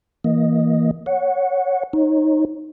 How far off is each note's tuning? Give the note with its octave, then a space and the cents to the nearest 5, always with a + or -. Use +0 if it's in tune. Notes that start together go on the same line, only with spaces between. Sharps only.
E3 +0 A#3 +0 D#5 +0
C#5 +0 F#5 -10
D#4 +0 C#5 -35